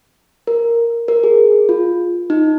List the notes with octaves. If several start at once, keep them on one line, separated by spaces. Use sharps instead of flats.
A#4
A#4
G#4
F4
D#4